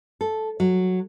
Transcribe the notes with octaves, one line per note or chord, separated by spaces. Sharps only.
A4
F#3